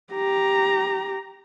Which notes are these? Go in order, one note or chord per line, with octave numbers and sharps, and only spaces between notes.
G4 A#5